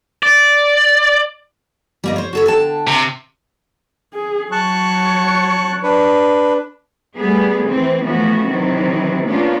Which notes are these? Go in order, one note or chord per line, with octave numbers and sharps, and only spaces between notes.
D5
G3 A#3 D#5
C5 C#5
F#4 A4 C#5
D3 G5 A5
C3
G#4
F#3 C#5 A5 C#6 F#6
D4 B4
G3 A3 B3 G#4
E3 C4
E3 F3 A3 B3 C#4 F#4
C3 D#3 E3 F#3 C4
A#3 B3 C#4 D4 F4